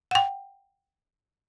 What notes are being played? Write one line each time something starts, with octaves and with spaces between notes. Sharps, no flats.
F#5 G5